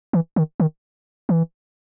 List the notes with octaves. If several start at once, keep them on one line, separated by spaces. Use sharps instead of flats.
E3
D#3
D#3
E3